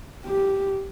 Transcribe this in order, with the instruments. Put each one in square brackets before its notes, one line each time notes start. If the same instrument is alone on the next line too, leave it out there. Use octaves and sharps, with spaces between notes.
[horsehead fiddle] G4